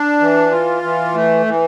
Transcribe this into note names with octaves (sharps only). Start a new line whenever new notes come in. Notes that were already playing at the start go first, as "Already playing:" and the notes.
Already playing: D4
E3
F4
E3
A3
E3